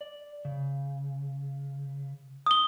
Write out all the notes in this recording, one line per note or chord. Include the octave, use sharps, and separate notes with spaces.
D5
C#3
D#6 G7